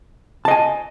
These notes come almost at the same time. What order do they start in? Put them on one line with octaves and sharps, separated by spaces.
A5 D#5 G#5